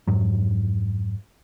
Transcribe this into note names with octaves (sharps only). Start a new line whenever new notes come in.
F2 G#2 F#3